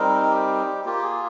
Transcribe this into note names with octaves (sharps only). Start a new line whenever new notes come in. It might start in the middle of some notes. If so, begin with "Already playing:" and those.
Already playing: G3 C4 D#4 A#4
G4
A#3 F4 G4
G#4